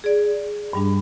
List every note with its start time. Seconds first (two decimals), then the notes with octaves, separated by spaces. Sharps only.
0.04 G#4 D5
0.73 G2 G3 D4